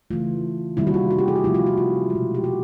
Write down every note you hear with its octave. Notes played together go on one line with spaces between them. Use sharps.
C#3 E3 A3 F4
C3 D#3 G3 A#3 E4
F#4
F4
F#4
G4
G#4
F#4
C3 F3 A3 E4
F4
F#4
F4
G#3
B2
G4
F#4